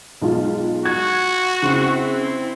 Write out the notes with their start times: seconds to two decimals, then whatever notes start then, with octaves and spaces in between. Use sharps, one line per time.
0.22 B1 G#3 F4
0.85 F#4 G#6
1.62 C#3 C4 E4